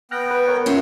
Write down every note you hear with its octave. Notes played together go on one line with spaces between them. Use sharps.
B3 G5 F6 F#6 A#6
B4
A#4 C#5 F#5
A#3 C#4 F4 E5